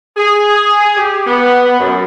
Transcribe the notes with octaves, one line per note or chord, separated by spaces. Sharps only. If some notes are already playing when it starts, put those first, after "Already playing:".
G#4
G4
B3
F#2